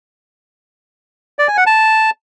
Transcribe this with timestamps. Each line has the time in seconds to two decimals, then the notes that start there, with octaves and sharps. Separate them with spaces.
1.39 D5
1.48 G#5
1.57 F#5
1.66 A5